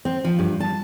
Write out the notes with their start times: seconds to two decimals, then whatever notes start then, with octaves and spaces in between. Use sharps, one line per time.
0.05 C4
0.24 F3
0.39 G2
0.60 A5